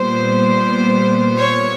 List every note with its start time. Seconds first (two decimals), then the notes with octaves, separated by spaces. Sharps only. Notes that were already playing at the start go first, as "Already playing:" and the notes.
Already playing: A#2 G3 B3 C5
1.38 C#5